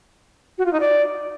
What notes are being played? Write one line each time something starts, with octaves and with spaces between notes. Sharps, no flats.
F#4
F4
D#4
D5